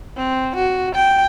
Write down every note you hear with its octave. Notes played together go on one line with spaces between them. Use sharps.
C4
F#4
G5